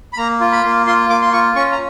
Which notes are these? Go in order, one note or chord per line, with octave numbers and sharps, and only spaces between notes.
B5
A#3 A#5
F4
B5
A#3
F4 C6
A#3 D6
C6
F4 C#6
C#4 C#6
A#5